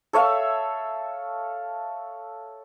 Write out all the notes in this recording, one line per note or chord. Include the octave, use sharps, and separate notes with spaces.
A4 C#5 E5 F5